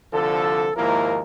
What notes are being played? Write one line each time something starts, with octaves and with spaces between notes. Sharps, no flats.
C2 D3 F3 A4
D#2 G#2 F3 A#3 E4 A#4